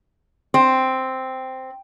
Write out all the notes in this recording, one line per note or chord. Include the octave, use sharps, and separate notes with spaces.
C4